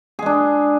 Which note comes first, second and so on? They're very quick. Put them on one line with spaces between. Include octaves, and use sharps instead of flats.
G#4 G#3 D4